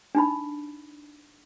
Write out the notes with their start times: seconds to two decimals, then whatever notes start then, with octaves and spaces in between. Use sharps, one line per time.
0.15 D4 D#4 B5